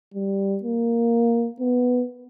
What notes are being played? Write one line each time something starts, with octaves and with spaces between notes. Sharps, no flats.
G3
A#3
B3